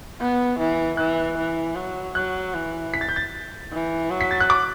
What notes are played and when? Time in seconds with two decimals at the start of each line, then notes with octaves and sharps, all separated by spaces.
0.20 B3
0.59 E3
0.97 E3 F#6
1.37 E3
1.75 F#3
2.15 F#3 F#6
2.54 E3
2.94 B6
3.01 A6
3.09 G6
3.16 A6
3.72 E3
4.10 F#3
4.21 B6
4.31 A6
4.40 F#6
4.50 D6